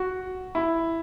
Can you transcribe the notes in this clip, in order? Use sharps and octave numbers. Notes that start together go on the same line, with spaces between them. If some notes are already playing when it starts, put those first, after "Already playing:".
Already playing: F#4
E4